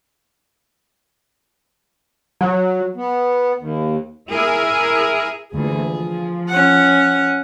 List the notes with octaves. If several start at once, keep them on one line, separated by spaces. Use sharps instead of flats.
F#3
B3
D#2
E4 G#4 A#4 E5
D2 A#2 E3 G#4
F3
C#4 F#5